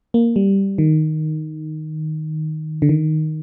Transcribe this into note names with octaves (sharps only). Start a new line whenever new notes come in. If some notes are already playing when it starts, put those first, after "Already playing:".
A#3
G3
D#3
D3
D#3